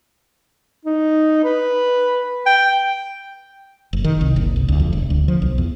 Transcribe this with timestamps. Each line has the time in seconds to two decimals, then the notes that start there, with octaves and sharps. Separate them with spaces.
0.85 D#4
1.44 B4
2.47 G5
3.93 F#1
4.04 D#3
4.21 C2
4.36 F#1
4.56 C2
4.68 D2
4.80 F2
4.93 E1
5.10 D2
5.28 F3
5.42 B1
5.58 E2